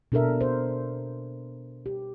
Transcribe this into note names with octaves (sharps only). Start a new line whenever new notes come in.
B2 D4 A4 A#4 E5
C5
G4